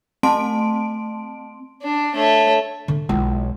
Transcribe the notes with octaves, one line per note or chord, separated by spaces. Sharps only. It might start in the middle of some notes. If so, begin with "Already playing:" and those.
A3 C4 A5 C6 D7
D4
A3 C#5
D3
B1 G#3 E4